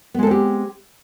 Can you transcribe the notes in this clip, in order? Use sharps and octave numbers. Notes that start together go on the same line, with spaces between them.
G#3 B3 C4 G4 A4